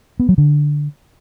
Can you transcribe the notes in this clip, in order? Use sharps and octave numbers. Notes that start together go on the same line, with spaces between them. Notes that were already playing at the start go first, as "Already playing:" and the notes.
B3
F#3
D3